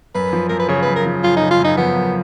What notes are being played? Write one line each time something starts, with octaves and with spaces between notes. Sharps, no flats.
F#2 B4
F3
F#2 A#4
B4
C#3 C#5
F#2 B4
A#4
F3
F#2 F4
D#4
C#3
F4
F#2 D#4
F3 B3
F#2